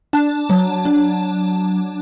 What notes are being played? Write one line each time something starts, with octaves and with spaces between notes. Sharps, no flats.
D4 A5
F#3
D4